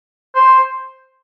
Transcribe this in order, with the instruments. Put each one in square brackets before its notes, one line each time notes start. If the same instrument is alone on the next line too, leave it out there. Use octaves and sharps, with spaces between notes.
[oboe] C5